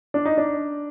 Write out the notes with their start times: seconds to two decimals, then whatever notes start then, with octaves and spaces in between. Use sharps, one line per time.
0.14 D4
0.25 D#4
0.37 D4